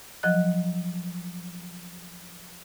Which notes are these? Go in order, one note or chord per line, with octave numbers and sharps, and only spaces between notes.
F3 F#3 D#5 F#6